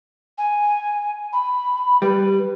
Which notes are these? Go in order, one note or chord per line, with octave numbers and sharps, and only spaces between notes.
G#5
B5
G3 B4